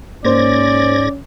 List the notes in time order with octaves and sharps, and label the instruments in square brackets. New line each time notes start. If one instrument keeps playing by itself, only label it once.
[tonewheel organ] G#2 G#6 A#6 [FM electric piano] A#3 C5 [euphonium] C#4 [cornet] D5